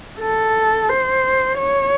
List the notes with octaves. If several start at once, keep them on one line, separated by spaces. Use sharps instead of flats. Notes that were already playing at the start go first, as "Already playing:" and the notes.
A4
C5
C#5